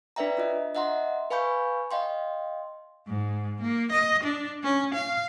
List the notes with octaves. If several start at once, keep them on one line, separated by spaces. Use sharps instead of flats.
D4 B4 D5 E5 G5 A#5
D4 F4 D#5
D#5 E5 F#5 A#5 C6
B4 F5 G#5 B5 C#6 G6
D#5 F5 G5 C6
G#2
A#3
D#5
D4
C#4
F5